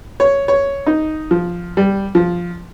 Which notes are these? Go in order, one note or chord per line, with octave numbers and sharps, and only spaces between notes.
C#5
C#5
D#4
F3
G3
F3